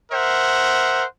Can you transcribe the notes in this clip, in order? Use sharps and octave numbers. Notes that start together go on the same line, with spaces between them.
A#4 C5 E5 F#5